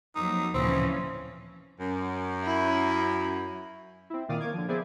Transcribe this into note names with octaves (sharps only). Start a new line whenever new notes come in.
F2 F#3 A#3 D#4
D1 A#2 C#3 E3 F3 C4 C#4
F#2
E4
C4 E4
A#2 D#3 D5 F5 D#6
A#3 C#5 D6 G#6
D3 F3
B3 E4 G#4 C5 D5 G#5